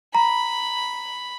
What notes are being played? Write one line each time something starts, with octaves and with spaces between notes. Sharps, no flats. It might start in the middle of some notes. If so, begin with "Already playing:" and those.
A#5 B5